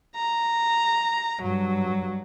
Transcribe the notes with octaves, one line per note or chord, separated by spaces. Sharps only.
A#5
G2 F#3